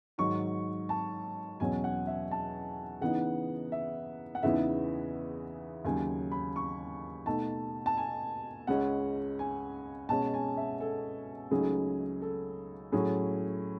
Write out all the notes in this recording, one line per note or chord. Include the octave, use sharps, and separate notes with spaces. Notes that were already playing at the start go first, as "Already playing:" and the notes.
G#2 D#3 F#3 C#6
A5
E2 B2 F#3 C#4 G#5
F#5
E5
A5
C#3 E3 B3 D#4 F#5
E5
F#5
E2 C#3 E3 B3 D#4 E5
D#2 C#3 F#3 G#5
B5
C#6
B2 A3 D#4 A5
A5
G#5
C#2 C#3 G#3 C#4 F#5
G#5
B2 G#3 C#4 A5
G#5
E5
A4
C#2 C#3 F#3 A3 D#4 G#4
A4
A2 F#3 C#4 G#4